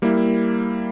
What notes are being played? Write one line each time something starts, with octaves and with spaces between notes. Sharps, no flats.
G3 A#3 E4